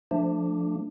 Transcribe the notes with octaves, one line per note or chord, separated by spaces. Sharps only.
F3 A3 D4